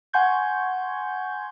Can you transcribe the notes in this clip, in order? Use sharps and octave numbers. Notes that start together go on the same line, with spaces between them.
F#5 G#5 C6 C#6 G6 G#6